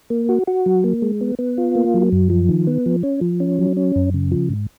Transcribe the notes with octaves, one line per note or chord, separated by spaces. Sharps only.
A#3
F#4
F#4
F#3
A#3
G#3
B3
B3
F4
A#3
F#3
F#2
F3
D#3
B3
F3
C#4
F3
C#4
F#3
C#4
F#2
C#3
F3
G#2